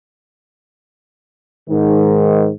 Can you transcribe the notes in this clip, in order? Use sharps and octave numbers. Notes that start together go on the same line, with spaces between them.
G#2 D#3